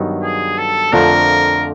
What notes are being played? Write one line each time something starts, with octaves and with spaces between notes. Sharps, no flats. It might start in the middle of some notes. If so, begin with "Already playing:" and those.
Already playing: G2 D#3 F#3 B3 D#4
G#4
A4
F2 D3 F3 A3 D4 A#4